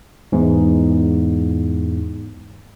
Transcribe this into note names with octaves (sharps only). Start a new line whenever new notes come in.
E2 G#2